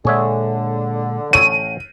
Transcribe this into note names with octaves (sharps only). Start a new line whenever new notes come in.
A#2 D3 G#3 G#4 C#5 E5
A1 A4 C#5 D#7